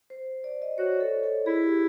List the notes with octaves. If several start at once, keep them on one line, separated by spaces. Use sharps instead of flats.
C5
D5
D#5
F#4 C#5
A4
A4
E4 G#4
G4